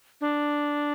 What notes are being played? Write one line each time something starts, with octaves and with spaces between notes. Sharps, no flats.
D4